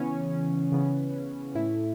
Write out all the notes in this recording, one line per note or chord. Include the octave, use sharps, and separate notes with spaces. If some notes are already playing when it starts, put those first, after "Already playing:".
Already playing: C#3 E3 B3 C#4
C#3 E3 B3
A2 A3 E4